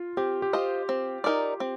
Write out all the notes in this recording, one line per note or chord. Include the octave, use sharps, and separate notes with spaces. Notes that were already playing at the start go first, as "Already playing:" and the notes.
Already playing: F4
C4 G4
G4
F4 C5 D#5
C4
D#4 A#4 D5
C4